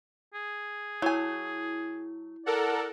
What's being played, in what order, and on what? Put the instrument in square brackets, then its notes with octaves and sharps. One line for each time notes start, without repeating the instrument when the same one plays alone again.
[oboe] G#4
[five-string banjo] F#3 G#5 [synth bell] E4
[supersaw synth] A4 A#4 F#5 [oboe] D5